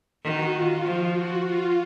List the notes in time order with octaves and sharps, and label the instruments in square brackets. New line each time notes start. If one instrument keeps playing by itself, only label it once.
[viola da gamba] D#3 [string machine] F#4
[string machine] F4
[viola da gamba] F3
[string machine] F#4
F4